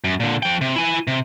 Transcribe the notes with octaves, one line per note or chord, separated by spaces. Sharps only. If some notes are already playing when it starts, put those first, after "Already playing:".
F#2
A#2 D3
F3 G5
C3
E4 G#5
C3